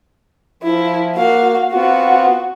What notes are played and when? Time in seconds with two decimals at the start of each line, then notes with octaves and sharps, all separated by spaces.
0.63 F3 E4
1.16 A#3 F#4 F5
1.72 B3 C4 F4 F#4